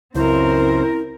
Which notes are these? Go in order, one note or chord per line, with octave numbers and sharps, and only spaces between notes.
C#2 F#2 C4 E4 A#4 C5